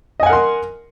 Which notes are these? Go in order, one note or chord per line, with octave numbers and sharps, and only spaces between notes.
A#4 D#5 F#5 G#5 C6